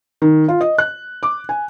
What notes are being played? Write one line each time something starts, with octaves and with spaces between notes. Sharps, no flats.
D#3
F4
D#5
F#6
D6
G#5